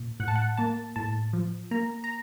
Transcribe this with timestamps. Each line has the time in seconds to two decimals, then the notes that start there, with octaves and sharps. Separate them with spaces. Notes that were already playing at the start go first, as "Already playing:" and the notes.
Already playing: A#2
0.20 A2 F#5
0.28 A5
0.35 F#5
0.57 A#3 A5
0.96 A2 A5
1.33 F3
1.71 A#3 A#5
2.04 A#5